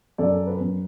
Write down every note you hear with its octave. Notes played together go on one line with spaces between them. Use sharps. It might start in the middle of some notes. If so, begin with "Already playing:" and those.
F#2 A4 D5
B4
F#2